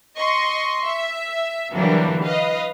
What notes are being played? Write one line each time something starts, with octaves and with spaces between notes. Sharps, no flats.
D#5 C6 C#6
E5
D3 E3 F#3 G3 A#3 D4
B4 D#5 F5